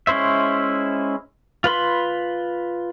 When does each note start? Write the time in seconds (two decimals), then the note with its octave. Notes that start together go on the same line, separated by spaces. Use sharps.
0.07 G#3 C#4 E4 C5 E5
1.64 F4 B4 B5 C6